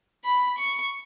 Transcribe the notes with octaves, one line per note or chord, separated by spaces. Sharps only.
B5
C#6